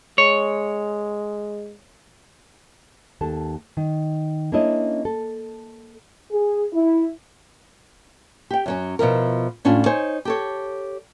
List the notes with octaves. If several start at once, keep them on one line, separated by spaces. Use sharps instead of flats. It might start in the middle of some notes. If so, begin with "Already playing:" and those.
G#3 C#5
D#2 A4 A5
D#3
A#3 C#4 D4 E4 C#5 D#5
A4
G#4
E4
G4 G5
F#2 F#3 C#4
B2 F3 E4 A#4
A2 C#4 D4 F4
D#4 C5 C#5 G#5
G4 A4 C#5